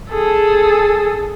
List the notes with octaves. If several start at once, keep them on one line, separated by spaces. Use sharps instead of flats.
G#4 A4